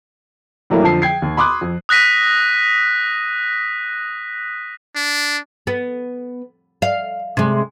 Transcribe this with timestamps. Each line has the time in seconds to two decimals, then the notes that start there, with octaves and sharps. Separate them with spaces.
0.70 A2 E3 F#3 G3 A3 A#3
0.83 F2 D3 F3 A5 C7
1.02 G5 G#6 C7
1.22 D#2
1.37 B5 C6 D6 D#6 F#6
1.61 F2
1.89 D#6 F#6 A#6 B6 D#7
4.96 D4
5.67 B3
6.82 F5
7.37 C3 G#3